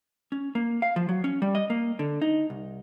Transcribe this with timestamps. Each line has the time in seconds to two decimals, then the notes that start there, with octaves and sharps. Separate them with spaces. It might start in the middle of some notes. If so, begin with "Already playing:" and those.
0.32 C#4
0.55 A#3
0.82 F5
0.96 F3
1.09 F#3
1.24 C#4
1.42 G3
1.55 D#5
1.70 A#3
1.99 D3
2.22 D#4
2.50 C2